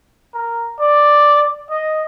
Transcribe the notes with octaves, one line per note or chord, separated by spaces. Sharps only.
A#4
D5
D#5